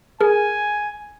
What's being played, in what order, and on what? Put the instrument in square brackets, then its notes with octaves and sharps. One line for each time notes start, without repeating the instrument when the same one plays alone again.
[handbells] G#4 A#4 [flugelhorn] G#5